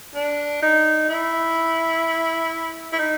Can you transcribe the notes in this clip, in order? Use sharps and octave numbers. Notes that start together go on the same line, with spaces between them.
D4
D#4
E4
E4
D#4